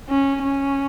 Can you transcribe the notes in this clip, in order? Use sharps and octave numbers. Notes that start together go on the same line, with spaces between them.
C#4
C#4